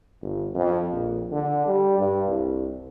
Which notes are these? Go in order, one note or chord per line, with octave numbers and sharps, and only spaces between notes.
G1
F2
A#1
D3
G3
G2
C2